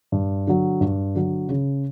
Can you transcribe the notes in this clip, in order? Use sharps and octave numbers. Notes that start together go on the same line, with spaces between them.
G2
D3 F#3
G2
D3 F#3
C#3